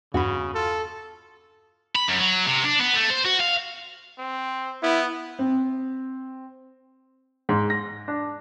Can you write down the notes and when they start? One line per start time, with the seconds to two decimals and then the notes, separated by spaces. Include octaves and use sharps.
0.14 E2 G2 C#3 F#4 B5
0.55 F4 A4
1.96 B5
2.09 F#2
2.21 F#3
2.46 C3
2.64 D4
2.81 B3
2.96 A3
3.11 C5
3.26 F#4
3.40 F5
4.18 C4
4.83 B3 E4
5.39 C4
7.49 G#2
7.70 A#6
8.08 D4